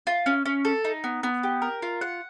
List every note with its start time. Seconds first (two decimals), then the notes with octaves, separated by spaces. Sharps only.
0.07 F4
0.26 C#4
0.45 C#4
0.65 A4
0.85 D#4
1.04 B3
1.23 B3
1.43 G4
1.62 A#4
1.82 F4
2.01 F#5